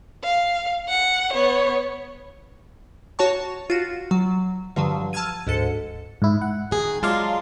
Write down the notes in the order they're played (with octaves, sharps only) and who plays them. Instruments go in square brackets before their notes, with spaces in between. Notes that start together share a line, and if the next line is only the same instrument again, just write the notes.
[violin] F5
F#5
B3 C#5
[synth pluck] F#4 C#5 A5 C#6
F4 F#4
F#3
G2 D3 F3 F#3
A5 E6 F6 G#6 D#7
D2 G#2 A4 C#7
[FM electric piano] G#2 E4
F#5
[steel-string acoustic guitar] D#3 G#4
[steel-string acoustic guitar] F#3 G#3 F4 [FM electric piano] D5 F5 A5